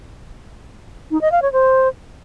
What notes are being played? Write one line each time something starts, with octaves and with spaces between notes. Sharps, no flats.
D#4
D#5
F5
C#5
C5